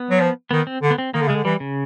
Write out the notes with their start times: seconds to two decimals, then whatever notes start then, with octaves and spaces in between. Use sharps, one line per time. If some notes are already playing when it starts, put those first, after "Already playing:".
Already playing: B3
0.11 F#3
0.20 F3
0.51 D#3 B3
0.67 C4
0.82 D3
0.91 B3
0.98 C4
1.14 D#3 A#3
1.21 D3
1.28 C#3 G#3
1.35 D3
1.44 E3 G3
1.60 C#3